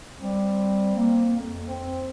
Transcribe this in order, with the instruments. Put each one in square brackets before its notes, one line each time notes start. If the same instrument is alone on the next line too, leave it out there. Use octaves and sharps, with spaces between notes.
[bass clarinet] G3 [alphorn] C4
[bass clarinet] A#3
F2
[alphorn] C4